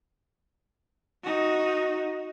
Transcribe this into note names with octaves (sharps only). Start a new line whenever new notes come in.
D#4 F#4